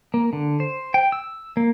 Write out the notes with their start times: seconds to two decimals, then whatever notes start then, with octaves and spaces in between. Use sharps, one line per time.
0.14 A#3
0.33 D3
0.60 C5
0.94 G5
1.12 E6
1.57 A#3